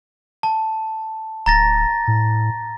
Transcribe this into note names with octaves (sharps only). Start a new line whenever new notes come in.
A5
D1 A#5 A6 A#6
A2